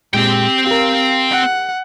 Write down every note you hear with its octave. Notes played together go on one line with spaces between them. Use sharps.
A#2 G#3 C4 G4 G5
G4 A#4 F5
F#5